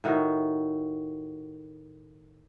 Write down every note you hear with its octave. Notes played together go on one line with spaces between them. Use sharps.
A2 D#3 F#4